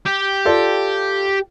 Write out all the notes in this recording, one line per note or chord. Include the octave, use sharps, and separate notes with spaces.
G4
F4 A4 D5